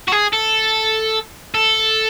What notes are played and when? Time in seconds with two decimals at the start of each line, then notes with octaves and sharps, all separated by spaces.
0.08 F#4
0.12 G#4
0.33 A4
1.55 A4